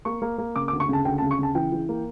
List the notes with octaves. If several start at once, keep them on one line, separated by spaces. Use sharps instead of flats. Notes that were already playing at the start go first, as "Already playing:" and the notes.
A#3 C#6
A#3
A#3
C#3 D6
D6
D2
C#6
C#3 A5
D2 G5
A5
C#3
C#6
C#3 A5
E3 G5
E3
A#3